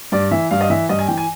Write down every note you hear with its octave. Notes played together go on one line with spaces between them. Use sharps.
G2 D5
E3 E5
G2 F5
D#5
E3 E5
G2 D#5
G#5
E3 G5
G#5